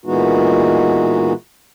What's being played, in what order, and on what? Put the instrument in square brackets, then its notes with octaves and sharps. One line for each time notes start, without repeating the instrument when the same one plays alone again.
[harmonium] A#2 E3 G#3 B3 D#4 F#4